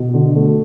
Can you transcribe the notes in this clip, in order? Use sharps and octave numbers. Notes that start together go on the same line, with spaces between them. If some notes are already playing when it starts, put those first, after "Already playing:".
Already playing: B2
D3
A3